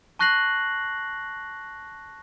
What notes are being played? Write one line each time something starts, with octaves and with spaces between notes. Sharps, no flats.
A5 C#6 F#6 A#6 C7 F#7